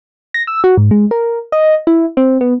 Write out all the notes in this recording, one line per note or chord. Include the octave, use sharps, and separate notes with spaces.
A#6
E6
F#4
G#2
G#3
A#4
D#5
E4
C4
B3